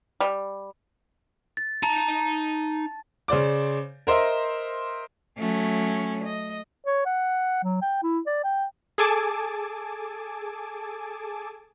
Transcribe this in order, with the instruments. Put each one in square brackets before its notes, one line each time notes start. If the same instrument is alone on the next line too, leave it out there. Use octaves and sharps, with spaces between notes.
[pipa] G3
[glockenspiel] A6
[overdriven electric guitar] D#4 A#5 [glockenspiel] A5
[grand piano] C#3 C5 D5 D6
A#4 C5 D#5 E5
[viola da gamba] F#3 A3 C#4
D#5
[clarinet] C#5
F#5
F#3
G5
E4
D5
G5
[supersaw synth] G#4 A4 G#5 A5 D6